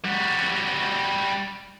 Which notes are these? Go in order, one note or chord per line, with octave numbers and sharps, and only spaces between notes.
G3 F#4